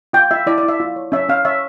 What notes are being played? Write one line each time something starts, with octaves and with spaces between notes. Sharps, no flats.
F4 G5
F4 E5
E4 D5
D5
E4
E5
F4
C#5
C#4 E5
C#4 F5
C#5 E5